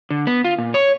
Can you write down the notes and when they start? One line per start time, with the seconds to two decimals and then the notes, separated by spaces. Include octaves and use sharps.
0.11 D3
0.27 B3
0.44 F4
0.58 A#2
0.74 C#5